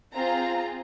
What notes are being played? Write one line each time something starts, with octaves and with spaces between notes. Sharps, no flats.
C4 F4 G#4 A#5